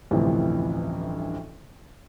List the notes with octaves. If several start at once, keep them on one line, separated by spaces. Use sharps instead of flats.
A1 D2 G2 C3 E3 F3